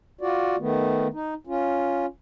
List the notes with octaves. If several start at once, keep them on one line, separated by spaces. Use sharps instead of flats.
F4 F#4 D5
D#3 A3 B3
D#4
C#4 F4